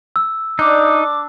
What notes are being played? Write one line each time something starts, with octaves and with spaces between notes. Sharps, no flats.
E6
D4 D#4 D6